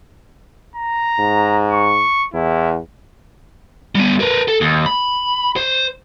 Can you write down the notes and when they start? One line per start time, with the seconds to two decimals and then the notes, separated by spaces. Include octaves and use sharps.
0.76 A#5
1.19 G#2
1.71 C#6
2.34 E2 E4
3.95 G3 B3
4.20 A#4 B4
4.48 A4
4.61 D#2
4.86 B5
5.56 C5